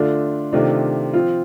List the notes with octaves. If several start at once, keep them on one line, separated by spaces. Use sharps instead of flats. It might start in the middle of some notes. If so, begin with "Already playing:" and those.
Already playing: D3 A3 D4 F4
C3 D#3 A3 D4 F4
F3 C4 F4